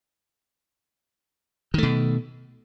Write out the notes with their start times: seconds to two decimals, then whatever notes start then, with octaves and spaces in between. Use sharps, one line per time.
1.74 D#3
1.78 A3
1.83 B2